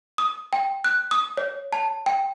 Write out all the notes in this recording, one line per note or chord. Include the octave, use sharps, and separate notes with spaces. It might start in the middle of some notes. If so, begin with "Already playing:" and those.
D#6
G5
F#6
D#6
C#5
A5
G5